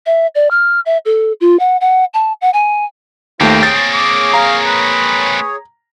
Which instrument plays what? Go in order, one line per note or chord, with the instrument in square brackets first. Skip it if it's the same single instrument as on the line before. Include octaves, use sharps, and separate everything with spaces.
[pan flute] E5
D5
F6
E5
A4
F4
F#5
F#5
A5
F#5
G#5
[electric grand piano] D#2 A3 [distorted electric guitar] A#3 C4 [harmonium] F4 C5 F5 [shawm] G5
[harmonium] G#4 C#5 [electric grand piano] A6
[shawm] D6
[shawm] F5 [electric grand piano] A#5
[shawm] B4